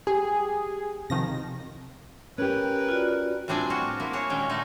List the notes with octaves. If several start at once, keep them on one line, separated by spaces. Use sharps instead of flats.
G4 G#4
C3 D#3 F3 A#6
C#4 G4 A#4 B4
F4 F#4 D5
A2 G3 C4 D4 G#4 G#5
F4 F#4 G#4
A#3 E4
F#4 G#4 C#5
A#2 D#3 G#3 C#4 G5
G#3 A3 D#4